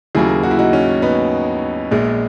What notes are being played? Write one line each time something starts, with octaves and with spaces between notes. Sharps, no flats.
D#2 C#3 F#3 A#3 E4 G#4
F#4
E4
D#4 F#4
C#4
B3 D#4
A#1 A#2 G#3